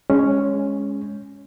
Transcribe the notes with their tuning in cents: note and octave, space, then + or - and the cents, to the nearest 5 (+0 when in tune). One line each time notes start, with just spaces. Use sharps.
G#3 +0 C#4 +0